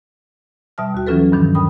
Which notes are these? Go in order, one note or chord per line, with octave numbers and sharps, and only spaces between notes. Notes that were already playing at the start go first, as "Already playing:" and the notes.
B2 G3 E5 G5 A5 F6
D#2 F#4
E3 F#3 C#4 F4 A4 B4
G2 B2 D#3 F3 D4
D#2 C#3 A#4 G5 B5 D#6